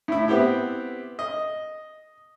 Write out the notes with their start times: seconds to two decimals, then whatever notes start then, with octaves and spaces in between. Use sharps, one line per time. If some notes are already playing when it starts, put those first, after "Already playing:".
0.08 A2 E4
0.28 B3 C4 E4 G4
1.19 D#5